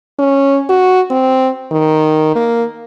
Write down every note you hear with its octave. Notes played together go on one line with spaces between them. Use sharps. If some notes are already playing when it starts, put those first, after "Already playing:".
C#4
F#4
C4
D#3
A#3